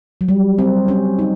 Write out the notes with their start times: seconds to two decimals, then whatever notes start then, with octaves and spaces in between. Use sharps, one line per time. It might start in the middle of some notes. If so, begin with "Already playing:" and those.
0.21 F#3
0.29 G3
0.58 C4
0.88 C#4
1.19 D#4